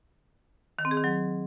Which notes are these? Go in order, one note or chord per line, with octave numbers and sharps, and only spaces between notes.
D#3
C4
G#4
D#3
F#3